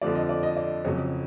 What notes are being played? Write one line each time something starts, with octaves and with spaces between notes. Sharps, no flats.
F2 D3 F3 D5
D#5
D5
D#5
D5
F2 C#3 F#3 C#5